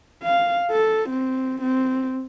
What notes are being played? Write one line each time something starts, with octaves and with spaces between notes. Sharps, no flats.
F5
A4
C4
C4